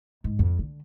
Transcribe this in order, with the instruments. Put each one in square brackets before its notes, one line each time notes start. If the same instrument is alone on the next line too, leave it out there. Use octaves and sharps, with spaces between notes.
[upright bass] G#2
F2
D3